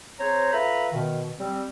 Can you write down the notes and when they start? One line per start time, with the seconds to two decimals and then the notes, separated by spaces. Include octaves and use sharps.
0.20 C4 G#4 C5 C#5 A#5
0.53 F4 A4 B4 E5 A#5 B5
0.92 B2 D#3
1.39 G3 C4